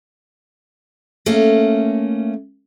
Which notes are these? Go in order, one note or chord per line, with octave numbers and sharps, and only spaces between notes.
A3 A#3 C#4